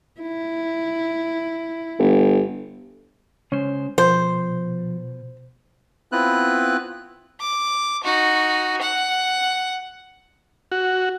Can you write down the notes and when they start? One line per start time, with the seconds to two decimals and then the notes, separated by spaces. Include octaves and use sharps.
0.21 E4
1.99 G1
3.52 C#3 G#3 C#4 C5
3.98 B2 F3 C5
6.12 B3 C4 E4 F4 B4 F#6
7.40 D6
8.03 D#4 F#4
8.81 F#5
10.72 F#4